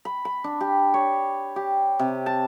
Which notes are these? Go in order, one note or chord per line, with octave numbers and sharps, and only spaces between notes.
B5
B5
D4
G4
C#5
G4
C3
A5